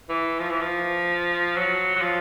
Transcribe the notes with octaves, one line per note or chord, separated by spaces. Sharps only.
E3
F3
E3
F3
F#3
F#3
F3